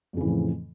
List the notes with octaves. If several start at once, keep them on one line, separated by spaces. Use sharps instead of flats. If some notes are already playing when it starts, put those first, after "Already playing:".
F2 A2 C#3 E3 F3